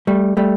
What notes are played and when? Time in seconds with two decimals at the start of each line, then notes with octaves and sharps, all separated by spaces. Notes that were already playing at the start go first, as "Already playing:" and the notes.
0.07 G3 A3
0.37 G3 A3